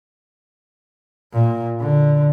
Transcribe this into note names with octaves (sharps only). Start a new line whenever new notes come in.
A#2
D3